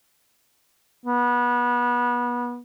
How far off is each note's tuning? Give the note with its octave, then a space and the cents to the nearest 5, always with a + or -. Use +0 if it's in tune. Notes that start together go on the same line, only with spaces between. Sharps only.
B3 -25